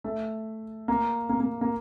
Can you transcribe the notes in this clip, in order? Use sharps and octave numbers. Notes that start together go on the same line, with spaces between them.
A3
A#3
A#3
A#3
A#3